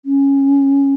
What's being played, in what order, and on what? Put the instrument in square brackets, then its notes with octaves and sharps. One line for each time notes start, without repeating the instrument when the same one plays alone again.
[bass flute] C#4